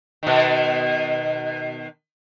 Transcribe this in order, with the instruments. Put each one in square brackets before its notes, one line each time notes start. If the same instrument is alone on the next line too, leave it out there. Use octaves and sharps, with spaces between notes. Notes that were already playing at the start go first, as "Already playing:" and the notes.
[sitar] B2 D#3